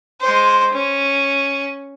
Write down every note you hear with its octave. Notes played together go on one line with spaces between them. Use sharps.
G#3 C5
C#4